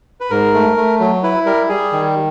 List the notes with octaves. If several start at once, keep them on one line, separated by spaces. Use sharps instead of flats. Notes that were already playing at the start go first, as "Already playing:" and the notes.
B4
G#2 A#4
A3
A3
F#3
E4 B4
G3 A#4
G3 G#4
D#3